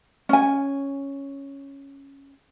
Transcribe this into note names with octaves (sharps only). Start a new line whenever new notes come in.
C#4 G#5